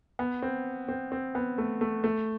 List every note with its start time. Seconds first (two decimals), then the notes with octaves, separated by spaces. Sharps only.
0.19 B3
0.42 C4
0.88 C4
1.12 C4
1.35 B3
1.58 A3
1.81 A3
2.04 A3